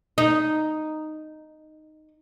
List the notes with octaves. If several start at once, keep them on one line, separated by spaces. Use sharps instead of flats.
D#4